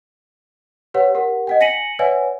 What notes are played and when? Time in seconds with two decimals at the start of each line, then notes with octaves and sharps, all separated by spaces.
0.94 G4 B4 C#5 F#5
1.15 G4 A#4 F#5
1.47 D#5 F#5 G5
1.60 G#5 A#6 B6 C#7 D#7 F#7
1.99 B4 C#5 D5 E5 F#5 G#5